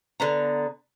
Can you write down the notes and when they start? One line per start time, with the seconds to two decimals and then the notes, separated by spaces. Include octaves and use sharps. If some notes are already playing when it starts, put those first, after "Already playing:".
0.20 D3 B3 A#5